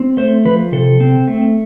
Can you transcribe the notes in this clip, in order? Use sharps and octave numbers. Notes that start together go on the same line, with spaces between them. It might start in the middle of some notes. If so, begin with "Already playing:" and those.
Already playing: C4
A3 C5
F3 B4
C3 A4
C4
A3